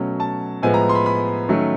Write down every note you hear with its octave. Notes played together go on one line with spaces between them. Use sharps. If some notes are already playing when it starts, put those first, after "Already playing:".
Already playing: B2 F#3 A3 C#4
A5
A2 F3 G#3 B3 G#5
A#5
C6
B5
B5
D#3 F#3 A3 C#4